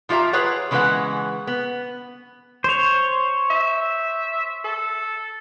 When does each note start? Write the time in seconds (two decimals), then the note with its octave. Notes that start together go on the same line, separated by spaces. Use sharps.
0.09 F3 F4 G4 E5 A#5
0.33 G#4 B4 C#5 F#5
0.71 C#3 E3 G#3 B3 B4 F#5
1.47 B3
2.64 C5 C#5
3.50 E5
4.65 A4